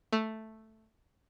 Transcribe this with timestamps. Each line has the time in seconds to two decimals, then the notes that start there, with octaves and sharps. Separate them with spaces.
0.12 A3